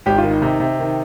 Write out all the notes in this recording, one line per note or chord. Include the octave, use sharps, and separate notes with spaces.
G#1 G4
F4
D#3
D#4
C3 D#4
C3
D#3